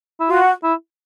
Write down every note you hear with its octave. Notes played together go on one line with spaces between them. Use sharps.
E4
F4 F#4
E4